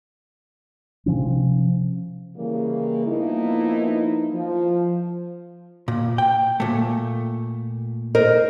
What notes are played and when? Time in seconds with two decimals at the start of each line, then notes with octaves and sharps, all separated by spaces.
1.06 C3 F3 C#4
2.37 C#3 E3 G3 A#3
3.06 F3 A#3 B3 D#4 E4
4.32 F3
5.88 A#2
6.18 G5
6.60 A#2 A3
8.15 A#4 C5 D#5